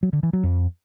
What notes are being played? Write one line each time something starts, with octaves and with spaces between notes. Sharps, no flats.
F#3
D3
E3
F#3
F2